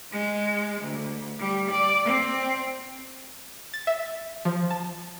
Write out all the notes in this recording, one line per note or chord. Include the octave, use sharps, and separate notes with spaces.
G#3
D2
G3
D5
C4
A6
E5
F3
A5